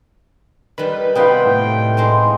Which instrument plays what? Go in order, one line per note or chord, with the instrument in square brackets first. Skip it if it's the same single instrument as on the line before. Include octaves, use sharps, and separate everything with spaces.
[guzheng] D#3 G3 [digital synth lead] B4
[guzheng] C3 G3 D#4 [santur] B3 C5 F5 [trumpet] G5
[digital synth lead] A2
[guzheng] G#3 C4 D#4